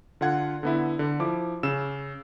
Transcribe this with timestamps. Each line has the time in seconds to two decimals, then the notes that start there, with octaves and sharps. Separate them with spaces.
0.21 D3 F4 F#5 G#6
0.63 D3 B3 E4
0.99 D3
1.20 F3 E4 D6
1.63 C#3 E6 E7